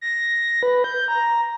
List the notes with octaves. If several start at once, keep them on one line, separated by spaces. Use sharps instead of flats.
A#6
B4
G6
A#5